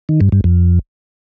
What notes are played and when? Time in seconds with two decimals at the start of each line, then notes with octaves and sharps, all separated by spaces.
0.09 D#3
0.21 G2
0.32 G2
0.44 F2